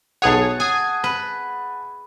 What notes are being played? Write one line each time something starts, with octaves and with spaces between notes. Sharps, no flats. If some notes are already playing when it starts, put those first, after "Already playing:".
B1 G#4 C#5 F#5 A5
G#4 G#5
B4